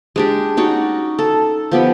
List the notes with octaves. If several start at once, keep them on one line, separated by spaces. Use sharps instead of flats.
G#3 D4 G4
C#4 D#4 F#4 D5
A4
F3 B3 G4 B5